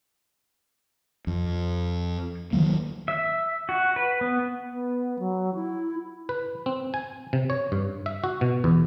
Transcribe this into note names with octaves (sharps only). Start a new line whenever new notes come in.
F2
D#3 E3 F#3 A#3
E5
F#4
B4
B3
B3
F#3
E4
B4
C4
G#5
C3
C#5
G2
E5
F#4
B2
E2